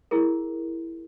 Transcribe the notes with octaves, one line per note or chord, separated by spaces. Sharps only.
E4 G#4 A#4